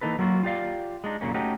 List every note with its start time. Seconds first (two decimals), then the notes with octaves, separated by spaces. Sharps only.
0.01 E3 A#3 D#4 A4 B4
0.19 F#3 A#3 F4 F#4
0.43 F4 G4 D5 F5
1.04 G#3 D4 D#4
1.21 F#2 A#2 C#3 A#3 C#4
1.34 A3 C#4 D#4 F#4 G4